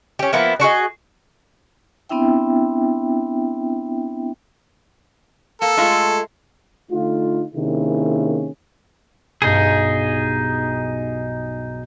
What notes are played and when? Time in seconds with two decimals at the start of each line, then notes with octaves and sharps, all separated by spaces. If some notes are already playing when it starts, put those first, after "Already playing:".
0.19 C#4 G4
0.33 F3 A#3 B3 E4
0.60 D4 F#4 G#4 D#5
2.09 B3 C4 D4 E4 E5 G5
5.62 A#3 A4
5.77 G#3 A3 F4
6.91 D3 A3 D#4 F4
7.54 C3 D#3 A#3 C#4 E4 G#4
9.42 B1 G2 D#4 G#4